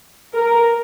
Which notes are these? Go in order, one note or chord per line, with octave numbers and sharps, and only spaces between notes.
A#4